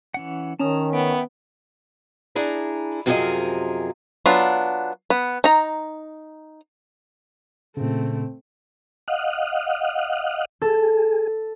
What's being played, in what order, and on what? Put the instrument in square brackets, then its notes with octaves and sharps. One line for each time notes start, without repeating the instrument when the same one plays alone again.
[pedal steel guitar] E3 C#4 F#5
[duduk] D#3 [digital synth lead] C#4 [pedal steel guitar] A5 A#5 D#6
[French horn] B3 [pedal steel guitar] E5 G5
[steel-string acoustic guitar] D4 E4 G#4 A#5
F#2 C3 F3 G#4 A#4 D#5
[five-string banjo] F#3 B3 D4 F4
B3
D#4 A#5
[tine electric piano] A#2 C#3 [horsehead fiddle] A3 C4
[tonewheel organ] D#5 F5 F#5
[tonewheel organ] G#4 [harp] A4